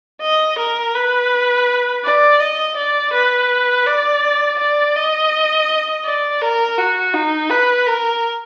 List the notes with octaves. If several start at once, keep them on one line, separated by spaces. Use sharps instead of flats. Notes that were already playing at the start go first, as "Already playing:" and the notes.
D#5
A#4
B4
D5
D#5
D5
B4
D5
D5
D#5
D5
A#4
F#4
D#4
B4
A#4